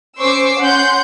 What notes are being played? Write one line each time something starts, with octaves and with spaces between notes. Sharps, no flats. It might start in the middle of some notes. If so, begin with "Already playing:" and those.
C#4 C5 C#6 D6 E6 C7
C#4 F#5 C6 G6